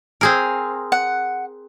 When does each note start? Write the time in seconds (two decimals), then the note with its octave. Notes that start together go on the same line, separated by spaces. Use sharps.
0.21 C4 G#4 A#4
0.92 F#5